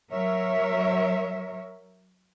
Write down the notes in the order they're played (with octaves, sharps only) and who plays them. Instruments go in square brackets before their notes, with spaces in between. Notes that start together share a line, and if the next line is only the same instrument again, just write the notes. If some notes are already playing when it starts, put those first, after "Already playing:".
[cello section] F#3 A#4 C#5 E5